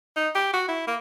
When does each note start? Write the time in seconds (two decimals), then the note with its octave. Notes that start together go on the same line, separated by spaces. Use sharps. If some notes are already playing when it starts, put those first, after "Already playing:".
0.17 D#4
0.35 G4
0.53 F#4
0.69 E4
0.87 A#3